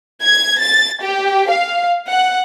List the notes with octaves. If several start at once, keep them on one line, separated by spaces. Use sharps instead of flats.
G#6
A6
G4
F5
F#5